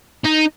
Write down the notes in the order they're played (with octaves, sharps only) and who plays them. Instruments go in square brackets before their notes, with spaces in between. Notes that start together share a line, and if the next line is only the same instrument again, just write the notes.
[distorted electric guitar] D#4